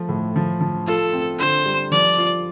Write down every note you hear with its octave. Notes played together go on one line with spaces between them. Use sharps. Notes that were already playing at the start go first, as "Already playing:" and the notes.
Already playing: F3 A3
A2
F3
F3
F4 A4
C4
D3 C5
G3
F3 D5
F4